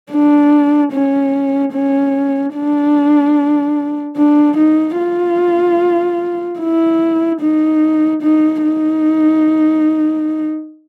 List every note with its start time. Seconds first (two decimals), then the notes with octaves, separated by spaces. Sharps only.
0.11 D4
0.92 C#4
1.73 C#4
2.55 D4
4.17 D4
4.57 D#4
4.98 F4
6.59 E4
7.41 D#4
8.22 D#4
8.63 D#4